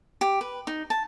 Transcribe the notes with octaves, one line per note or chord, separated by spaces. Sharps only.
G4
B4
D#4
A5